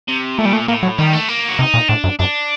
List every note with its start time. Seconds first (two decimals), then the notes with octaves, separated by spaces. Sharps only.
0.08 C3
0.38 A#2 A3
0.45 G3
0.53 A3
0.68 A2 A#3
0.83 F#3
0.98 D#3 G3
1.13 A3
1.29 A#3
1.49 F#4
1.59 C3 D#4
1.74 A#2
1.89 A2 D4
2.04 F#2
2.19 F#2 D4